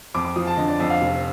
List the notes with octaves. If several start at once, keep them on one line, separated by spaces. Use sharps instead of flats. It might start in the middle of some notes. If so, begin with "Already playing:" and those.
F2 D6
D6
F3 D#6
A5
D3 D#5
D5
F2 D#5
F5
F1